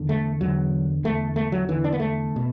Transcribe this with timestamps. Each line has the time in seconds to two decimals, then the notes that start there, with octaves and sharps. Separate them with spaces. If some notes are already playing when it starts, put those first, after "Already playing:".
Already playing: E2 D3
0.09 A3
0.41 E2 D3 F#3
1.04 E2 D3 A3
1.36 A3
1.52 F#3
1.68 E2 D3 E3
1.84 D4
1.92 B3
2.00 A3
2.36 B2